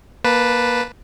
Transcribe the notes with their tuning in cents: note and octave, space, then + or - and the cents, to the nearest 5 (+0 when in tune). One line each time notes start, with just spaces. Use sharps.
A#3 +20 B4 +0 A5 +0